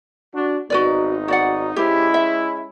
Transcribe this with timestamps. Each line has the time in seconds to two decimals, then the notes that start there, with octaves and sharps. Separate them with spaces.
0.34 D4 F#4
0.70 G#1 B3 D#4 F#4 B4 D5
1.28 F#4 D5 F#5
1.76 G#3 C#4 E4 G4 C5
2.14 E5